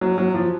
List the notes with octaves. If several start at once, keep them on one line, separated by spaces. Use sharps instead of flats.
F#3
F#3
F3